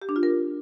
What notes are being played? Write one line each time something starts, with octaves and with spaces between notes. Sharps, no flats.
G4
D4
F4
A#4